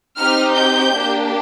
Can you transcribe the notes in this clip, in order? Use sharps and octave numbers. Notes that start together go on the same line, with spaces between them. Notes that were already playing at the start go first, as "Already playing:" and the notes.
C4 D#4 G4 F6
G6
A#3 D4 G4